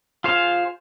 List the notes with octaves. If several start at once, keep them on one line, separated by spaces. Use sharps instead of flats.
F4 G#4 C5 F5